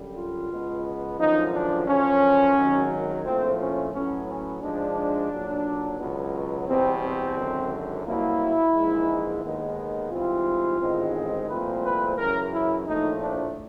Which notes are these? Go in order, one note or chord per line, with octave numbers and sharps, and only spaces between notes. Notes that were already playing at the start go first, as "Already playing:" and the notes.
Already playing: F#2 D3 G3
F4
C#2 B2 G#3 B3
G#1 F#2 D3 F3 D#4
D4
F#2 D3 F3 C#4
G#1 F#2 D#3 F#3
A#1 A2 F3 A3 C4
C#4
A2 F#3 B3 C#4
C#4
G#2 F3 G#3 D4
B1 A#2 F#3
C#2 B2 F#3 B3
E2 B2 G3 C4
C4
G#1 F#2 D3
C2 B2 F#3 A#3 E4
A#1 G#2 E3 G#3
D#2 D#3 G#3 B3
G#2 E3 G3 C4 F4
A1 G#2 D#3 G#3 C4
C2 A#2 F3 A3 C4 B4
B4
F#2 C#3 E3 A#4
E4
A#1 A2 F3 A3 D#4
D4